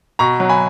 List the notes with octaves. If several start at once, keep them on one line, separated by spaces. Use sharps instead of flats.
B2 A#5 C#6
F#3
G#5 B5